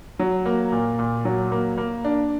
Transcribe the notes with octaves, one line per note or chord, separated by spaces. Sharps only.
F#3
A#3
A#2
A#2
F#3
A#3
A#3
D4